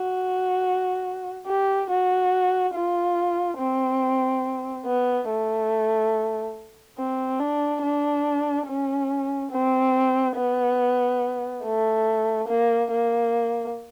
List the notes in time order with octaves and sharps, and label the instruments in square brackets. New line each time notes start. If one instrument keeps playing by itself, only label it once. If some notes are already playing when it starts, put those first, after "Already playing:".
Already playing: [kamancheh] F#4
G4
F#4
F4
C4
B3
A3
C4
D4
D4
C#4
C4
B3
A3
A#3
A#3